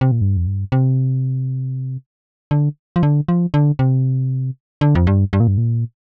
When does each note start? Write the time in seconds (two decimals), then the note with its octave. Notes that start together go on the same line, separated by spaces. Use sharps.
0.01 C3
0.12 A#2
0.21 G2
0.37 F2
0.47 G2
0.72 C3
2.51 D3
2.96 F3
3.03 D3
3.28 F3
3.54 D3
3.79 C3
4.81 D3
4.95 F2
5.07 G2
5.33 G2
5.40 A#2
5.48 G2
5.58 A#2